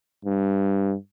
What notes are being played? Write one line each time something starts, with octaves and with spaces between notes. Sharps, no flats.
G2